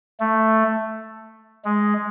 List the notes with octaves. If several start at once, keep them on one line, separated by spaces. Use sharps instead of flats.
A3
G#3